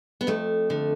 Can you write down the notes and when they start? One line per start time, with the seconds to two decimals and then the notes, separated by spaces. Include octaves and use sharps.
0.21 B3
0.27 F2 A3
0.70 D3